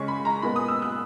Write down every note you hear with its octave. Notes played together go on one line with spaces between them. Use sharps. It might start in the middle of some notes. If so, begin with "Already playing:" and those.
Already playing: C#3 G#3 C#4 C#6
B5
A#5
A#2 G#3 B3 B5
D#6
E6
F#6